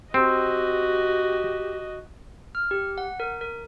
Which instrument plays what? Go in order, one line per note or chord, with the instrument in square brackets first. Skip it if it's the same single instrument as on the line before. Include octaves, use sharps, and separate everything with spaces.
[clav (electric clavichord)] C4 [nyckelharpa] F#4 D#5 [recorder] G4
[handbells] F6
G4
F#5
A#4
A#4